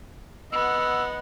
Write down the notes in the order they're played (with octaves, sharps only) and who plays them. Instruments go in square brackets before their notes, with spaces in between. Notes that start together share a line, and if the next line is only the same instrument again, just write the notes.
[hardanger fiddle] B3 [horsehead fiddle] D#5 F#5 [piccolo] E6